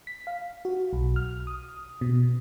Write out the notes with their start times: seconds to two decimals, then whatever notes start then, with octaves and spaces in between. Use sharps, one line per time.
0.07 B6
0.27 F5
0.65 F#4
0.93 B1
1.16 F6
1.47 D#6
2.01 B2